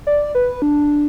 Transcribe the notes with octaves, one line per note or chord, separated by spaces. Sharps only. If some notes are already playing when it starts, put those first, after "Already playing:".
D5
B4
D4